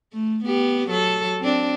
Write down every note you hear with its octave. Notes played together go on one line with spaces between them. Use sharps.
A3
B3 G4
F#3 A4
C4 D4